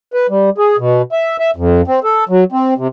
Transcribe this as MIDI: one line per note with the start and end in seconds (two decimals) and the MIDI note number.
0.14 0.27 71
0.30 0.50 55
0.58 0.77 68
0.79 1.02 47
1.12 1.37 76
1.40 1.51 76
1.56 1.81 41
1.87 2.00 60
2.04 2.24 69
2.29 2.44 54
2.52 2.74 60
2.78 2.88 48